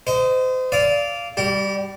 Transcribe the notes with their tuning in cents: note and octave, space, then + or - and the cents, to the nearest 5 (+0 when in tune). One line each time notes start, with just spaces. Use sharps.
C5 -35 D#5 +5
D5 -15 F5 -10 D#6 +35
G3 +5 G4 -40